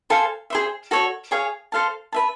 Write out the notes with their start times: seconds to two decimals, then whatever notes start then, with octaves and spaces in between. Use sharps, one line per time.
0.10 A4 C5 F5 G#5
0.50 G#4 C5 E5
0.91 F#4 A4 C#5
1.31 G#4 C#5 F5 G#5
1.72 A4 C5 F5 A5
2.12 B4 E5 A5